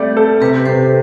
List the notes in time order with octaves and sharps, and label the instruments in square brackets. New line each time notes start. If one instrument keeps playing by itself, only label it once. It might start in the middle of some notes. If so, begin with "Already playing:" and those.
Already playing: [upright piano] G3 A3 D5 [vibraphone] C4
[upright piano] A4
[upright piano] C3 [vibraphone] G4 B4
[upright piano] C3 [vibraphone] A4 C5